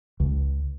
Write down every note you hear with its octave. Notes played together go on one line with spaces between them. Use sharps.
C#2